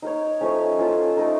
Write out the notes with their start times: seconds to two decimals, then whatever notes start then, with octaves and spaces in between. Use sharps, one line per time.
0.02 D#4 A#4 C#5
0.41 F3 A3 C#4
0.79 C#4 F4 A4
1.17 A3 D#4 A#4